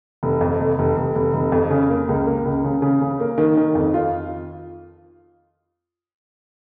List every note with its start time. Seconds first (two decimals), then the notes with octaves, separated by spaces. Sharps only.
0.23 F1
0.41 F2
0.60 F1
0.79 F1
0.97 F1
1.15 F1
1.34 F1
1.52 F2
1.70 C#3
1.90 A#3
2.09 C#2
2.26 A#3
2.45 C#2
2.64 C#3
2.82 C#3
3.01 C#3
3.20 A#3
3.38 D#3
3.57 D#3
3.75 F2
3.94 F4